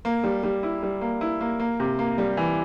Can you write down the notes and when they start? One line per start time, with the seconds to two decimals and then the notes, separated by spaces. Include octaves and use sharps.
0.05 A#3
0.24 G3
0.43 G3
0.63 E4
0.83 G3
1.01 A#3
1.21 E4
1.41 A#3
1.60 A#3
1.80 C3
1.99 A#3
2.18 G3
2.37 E3